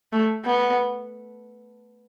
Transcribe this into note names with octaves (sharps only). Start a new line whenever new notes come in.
A3
B3